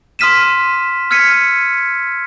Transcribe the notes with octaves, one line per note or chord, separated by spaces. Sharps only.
C6 D#6 F6 B6 D#7 E7
E6 F6 G#6 B6 C#7 D#7